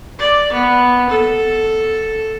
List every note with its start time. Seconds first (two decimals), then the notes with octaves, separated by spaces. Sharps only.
0.19 D5
0.52 B3
1.09 A4